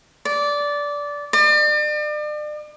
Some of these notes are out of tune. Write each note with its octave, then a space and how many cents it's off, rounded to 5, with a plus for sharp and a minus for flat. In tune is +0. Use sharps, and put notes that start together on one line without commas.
D5 -15
D5 +40